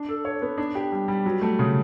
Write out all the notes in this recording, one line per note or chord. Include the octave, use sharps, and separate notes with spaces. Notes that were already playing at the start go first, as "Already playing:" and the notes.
Already playing: D4
A4
C#5
B3
D4
G4
G3
G3
F#3
A3
C#3